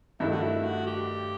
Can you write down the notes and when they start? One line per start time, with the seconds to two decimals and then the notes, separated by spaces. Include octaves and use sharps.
0.20 G2 D#3 A3 E4
0.32 F#4
0.43 E4
0.65 F#4
0.87 G4